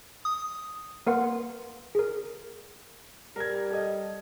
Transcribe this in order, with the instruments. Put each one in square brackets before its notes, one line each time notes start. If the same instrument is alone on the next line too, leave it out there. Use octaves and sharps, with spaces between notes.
[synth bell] D#6
[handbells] A#3 A#4 B4 F#5 C6
G#4 A#4
[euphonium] G3 [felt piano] A#4 G#6
[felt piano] A4 D#5